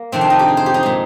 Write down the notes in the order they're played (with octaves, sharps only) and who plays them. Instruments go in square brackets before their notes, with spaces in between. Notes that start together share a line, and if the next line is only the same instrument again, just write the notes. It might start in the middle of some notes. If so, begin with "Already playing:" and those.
Already playing: [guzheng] A#3
F2 C3 D#3 C4
D4
D#4
G4
G#4
C5
G4
D#4
A#2 G#3